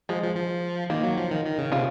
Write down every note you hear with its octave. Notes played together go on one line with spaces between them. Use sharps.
F3 G#3
F3
F3
D#3 A#3
F#3
F3
D#3
D#3
C#3
C3 C#4 F4